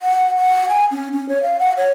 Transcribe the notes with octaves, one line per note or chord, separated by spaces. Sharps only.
F#5
F#5
G#5
C#4
C#4
C#5
F5
F#5
C#5